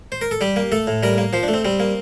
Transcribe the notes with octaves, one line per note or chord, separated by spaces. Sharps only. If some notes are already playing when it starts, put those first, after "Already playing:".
C5
A#4
A4
G3 G4
A#3
A3 A4
A2
G3 A#4
A#3
F3 C5
D4
A3
C4
G3 C4
A#3